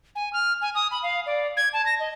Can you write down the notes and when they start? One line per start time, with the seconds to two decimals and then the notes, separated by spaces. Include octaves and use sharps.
0.15 G#5
0.33 F6
0.61 G#5
0.75 D#6
0.91 B5
1.03 F5
1.26 D5
1.57 G#6
1.73 A5
1.86 A#6
2.00 D#5